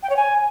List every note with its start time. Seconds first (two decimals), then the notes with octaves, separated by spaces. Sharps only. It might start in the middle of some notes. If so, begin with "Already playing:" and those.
0.03 G5
0.10 C#5
0.16 G#5